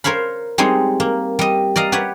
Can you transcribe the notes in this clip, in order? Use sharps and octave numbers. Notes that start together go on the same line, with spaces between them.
A#4 C5 C#5 F5 B5
G3 G#3 C4 D#4 C#5
A#3
G3 D#5
D5 D#5 F5 A#5
G4 B4 C#5 F#5